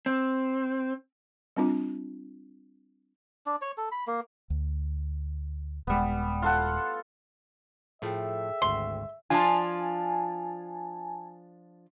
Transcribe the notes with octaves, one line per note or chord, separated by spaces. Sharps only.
C4
G3 C4 D4 F4
D4
C#5
A4
B5
A#3
D2
D#1 G3 G#3 B3
F4 A4 F#5
A2 F3 A3 G#4 A4 E5 G5
G#1 D2 C6
F3 D4 F4 G#5 A5